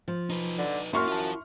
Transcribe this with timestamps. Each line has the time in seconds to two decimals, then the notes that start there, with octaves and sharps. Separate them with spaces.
0.08 F3
0.30 D#4 B4
0.58 D3
0.93 F#2 A#3 E4 C6 C#6 F6
1.08 F4 A5